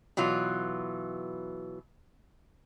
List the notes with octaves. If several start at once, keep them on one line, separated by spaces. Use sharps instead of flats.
B2 E3 F#3 F4